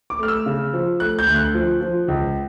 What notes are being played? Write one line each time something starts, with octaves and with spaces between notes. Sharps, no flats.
D6
A3 F6
E6
C#3
F3
A3 F#6
G6
D2
F#6
F3
F3
C#2